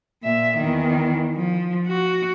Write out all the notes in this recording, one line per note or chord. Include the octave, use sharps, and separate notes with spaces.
A#2 E5
E2 D#3
F3
F#4